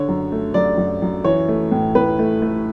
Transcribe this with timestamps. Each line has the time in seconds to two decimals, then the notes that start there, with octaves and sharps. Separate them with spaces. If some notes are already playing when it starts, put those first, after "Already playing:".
Already playing: D3 C#5
0.09 F#2
0.32 A3
0.54 F#2 D5
0.78 F#2
1.02 F#2
1.24 E3 C#5
1.49 A3
1.71 A2
1.95 A2 B4
2.19 A3
2.42 A3